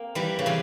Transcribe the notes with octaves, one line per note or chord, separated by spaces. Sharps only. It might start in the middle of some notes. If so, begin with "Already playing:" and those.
Already playing: A#3 C4
E3 G3
C#3
C3 E3